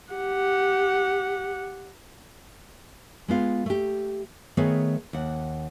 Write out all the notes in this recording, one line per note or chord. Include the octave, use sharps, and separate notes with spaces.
G4 F#5
G#3 B3 F4
A3 G4
D#3 A3 B3 G#4 C#5
D#2 F#5